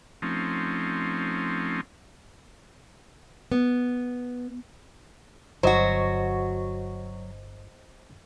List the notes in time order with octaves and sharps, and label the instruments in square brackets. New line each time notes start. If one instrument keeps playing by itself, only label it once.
[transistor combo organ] F3 A3 C4 C#4 D#4
[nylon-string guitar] B3
[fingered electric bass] G1 [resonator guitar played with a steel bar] F#3 F#4 [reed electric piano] C5 D#5